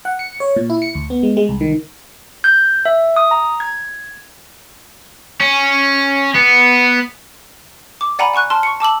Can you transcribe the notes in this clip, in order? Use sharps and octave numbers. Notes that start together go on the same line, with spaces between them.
F#5
C#7
C#5
A#2
E4
C#7
D2
B3
G#3
G#3
C2
D#3
G6
E5
D#6
A#5
G#6
C#4
B3
D6
D5 F#5 G#5 A#5 B5
F#5 G#5 C#6 F#6
A5 C6 F6
C#6 C#7
A5 D6 E6 F#7